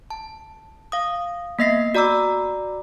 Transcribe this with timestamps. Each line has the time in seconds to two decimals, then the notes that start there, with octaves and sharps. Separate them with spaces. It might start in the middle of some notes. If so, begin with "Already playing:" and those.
0.10 A5
0.92 F5 D#6
1.59 A#3 B3 D#5 E5 A#6 C7
1.95 F#4 D5 A#5 D6 E6